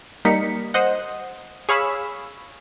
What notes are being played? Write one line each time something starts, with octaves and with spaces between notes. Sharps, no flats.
G3 A#3 D#4 B6 C#7
C5 D#5 F#5
G#4 C#5 F5 B5 E6